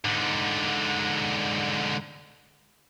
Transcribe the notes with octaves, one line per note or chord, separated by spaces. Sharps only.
G#2 D3